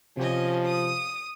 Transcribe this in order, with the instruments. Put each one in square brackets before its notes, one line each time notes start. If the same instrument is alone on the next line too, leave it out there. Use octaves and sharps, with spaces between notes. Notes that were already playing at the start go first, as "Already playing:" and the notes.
[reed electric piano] C3 G4 [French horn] F3 [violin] C#4 D#5
[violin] D#6